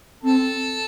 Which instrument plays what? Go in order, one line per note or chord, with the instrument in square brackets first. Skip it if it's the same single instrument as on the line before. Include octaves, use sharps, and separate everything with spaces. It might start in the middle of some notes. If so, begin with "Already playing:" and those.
[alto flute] C4 [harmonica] A4